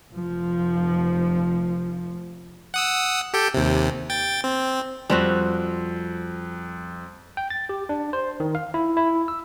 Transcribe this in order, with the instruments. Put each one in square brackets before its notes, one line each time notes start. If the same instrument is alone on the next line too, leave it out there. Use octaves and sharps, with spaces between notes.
[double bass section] F1 F3
[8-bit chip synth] F#5 D#6 E6
G4 A4 G5
D#2 C3
G5 A6
C4
[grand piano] F2 [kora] G3 C4 F#4
[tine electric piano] G5
A6
G4
D4
C5
D#3
F5
E4
E4
E6